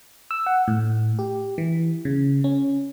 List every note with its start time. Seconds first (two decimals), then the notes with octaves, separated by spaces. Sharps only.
0.31 E6
0.46 F#5
0.68 A2
1.19 G4
1.58 E3
2.05 C#3
2.44 C#4